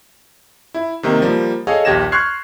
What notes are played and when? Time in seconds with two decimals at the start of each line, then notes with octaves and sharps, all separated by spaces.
0.74 E4
1.03 C3 D#3 A#3
1.22 F3 G3 A#3
1.67 G#4 A4 C#5 D#5 F5
1.85 A#1 D#2 G4 G#6 A#6 E7
2.12 C6 C#6 F6 F#6 G#6 C7